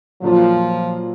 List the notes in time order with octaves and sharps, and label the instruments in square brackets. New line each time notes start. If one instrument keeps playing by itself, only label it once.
[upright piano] A#2 F#3 A#3 F4 [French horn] F3